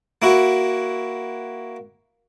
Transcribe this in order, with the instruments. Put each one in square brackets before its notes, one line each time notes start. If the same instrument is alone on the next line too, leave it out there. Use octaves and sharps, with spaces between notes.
[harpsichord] A#3 E4 F#4